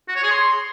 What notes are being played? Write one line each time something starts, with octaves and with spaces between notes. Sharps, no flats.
F#4
C#5
G#4
C6